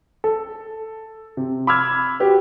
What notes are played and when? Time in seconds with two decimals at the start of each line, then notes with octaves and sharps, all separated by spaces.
0.24 A4
1.37 C3
1.67 B5 D6 E6 F6 G#6
2.20 F#4 G4 B4